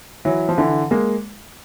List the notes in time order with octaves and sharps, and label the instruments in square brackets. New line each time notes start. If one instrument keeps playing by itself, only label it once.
[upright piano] E3 F#3
F3
D3 E3
G#3 A#3